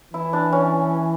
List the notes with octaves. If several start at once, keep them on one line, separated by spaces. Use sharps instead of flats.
E3 E4
D4
C#4